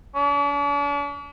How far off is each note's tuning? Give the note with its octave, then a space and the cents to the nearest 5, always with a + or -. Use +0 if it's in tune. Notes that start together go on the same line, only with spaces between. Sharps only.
D4 -45